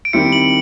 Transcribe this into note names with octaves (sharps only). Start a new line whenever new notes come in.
D7
D#3 G3 C4 E4 C#7
F#7